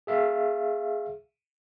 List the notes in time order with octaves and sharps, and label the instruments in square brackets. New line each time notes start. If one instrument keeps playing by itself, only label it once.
[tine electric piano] G#4 E5 F5